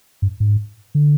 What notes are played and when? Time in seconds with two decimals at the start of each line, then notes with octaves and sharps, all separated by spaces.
0.22 G2
0.40 G#2
0.95 D3